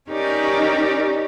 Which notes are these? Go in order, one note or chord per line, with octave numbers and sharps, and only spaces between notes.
C#4 D#4 G4 A#4 C#5 D5